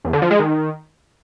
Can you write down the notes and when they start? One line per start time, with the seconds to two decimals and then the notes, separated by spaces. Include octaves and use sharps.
0.05 E2
0.13 D3
0.22 F3
0.31 G#3
0.39 D#3